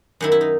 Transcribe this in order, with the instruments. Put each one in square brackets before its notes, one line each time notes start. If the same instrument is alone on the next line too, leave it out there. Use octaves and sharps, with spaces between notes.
[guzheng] F#2 D#3 E4
E4
D#4